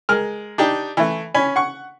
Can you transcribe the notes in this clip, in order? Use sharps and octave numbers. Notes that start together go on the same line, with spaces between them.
G#3 A#4 F6
D4 D#4 G4
E3 A3
C#4 G#5 B5
F#5 C#6